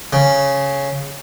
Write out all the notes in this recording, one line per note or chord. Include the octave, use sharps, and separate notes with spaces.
C#3